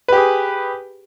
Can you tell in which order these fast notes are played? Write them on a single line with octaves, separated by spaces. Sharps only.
B4 G4 G#4